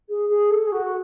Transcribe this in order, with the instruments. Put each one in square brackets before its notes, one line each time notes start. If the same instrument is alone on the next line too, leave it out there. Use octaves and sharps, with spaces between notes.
[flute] G#4
G#4
A4
G#4
F#4